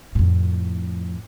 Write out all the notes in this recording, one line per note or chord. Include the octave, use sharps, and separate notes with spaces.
F2 A2